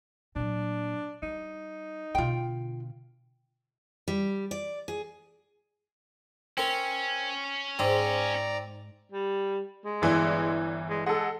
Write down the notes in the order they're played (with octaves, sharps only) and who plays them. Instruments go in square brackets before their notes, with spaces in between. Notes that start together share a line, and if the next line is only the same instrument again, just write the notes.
[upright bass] A#2 F#3 [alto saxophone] D4
[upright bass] G3 [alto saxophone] D#4
[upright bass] B2 D3 [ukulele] F4 G5
[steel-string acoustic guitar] G3
D5
G#4
[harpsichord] C4 A#4 [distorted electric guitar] C#4
[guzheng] G#2 [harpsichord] C4 [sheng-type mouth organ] D5 A#5
[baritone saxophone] G3
G#3
[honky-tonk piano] G1 E3 D5
[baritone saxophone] G#3
[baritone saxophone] G#3 [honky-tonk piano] A4 F#5